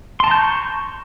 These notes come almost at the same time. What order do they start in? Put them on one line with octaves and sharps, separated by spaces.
C6 A5 A#5 G6 C#6